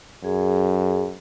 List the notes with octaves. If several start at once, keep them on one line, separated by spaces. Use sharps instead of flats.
F#2 G#4